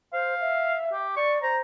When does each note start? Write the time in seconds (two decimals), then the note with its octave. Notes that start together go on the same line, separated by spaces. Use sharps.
0.13 C5 F5
0.41 E5
0.92 G4
1.16 D5 C#6
1.42 C5 A#5